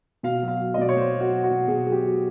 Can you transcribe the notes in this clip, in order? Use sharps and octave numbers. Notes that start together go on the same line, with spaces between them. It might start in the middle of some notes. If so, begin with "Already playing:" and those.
B2 F5
F#3
F5
F#3
D#5
B2 D5
C#5
B2 C5
F#3
F#4
F#3
F#4
B2
B2 G#4
F#3 G#4
G4
F#3